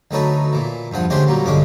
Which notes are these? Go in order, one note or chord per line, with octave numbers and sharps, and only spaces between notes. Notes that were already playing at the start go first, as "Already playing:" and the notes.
D2 F#3 D#4 A4 B4 C#5
A#2 E3
E2 G2 F3 F#5
D3 G#3 A3 C#4 G4 C5
A#2 F#3 G3 A#3
B1 G2 D3 G#3 C#4 D6